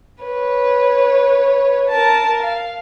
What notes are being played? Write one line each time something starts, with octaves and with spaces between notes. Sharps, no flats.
B4 C#5
A#4 A5
F5